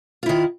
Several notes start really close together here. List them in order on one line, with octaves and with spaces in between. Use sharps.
F4 E4 D#3